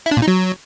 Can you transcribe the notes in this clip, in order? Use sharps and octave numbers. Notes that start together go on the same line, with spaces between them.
E4
D4
A#2
D#4
F#3